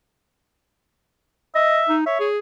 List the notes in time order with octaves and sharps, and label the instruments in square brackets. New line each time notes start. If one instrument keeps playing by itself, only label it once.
[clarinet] D#5 [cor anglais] E5
[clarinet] D#4
[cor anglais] C#5 [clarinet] E5
[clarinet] G#4